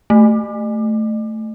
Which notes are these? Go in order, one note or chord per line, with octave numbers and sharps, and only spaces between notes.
A3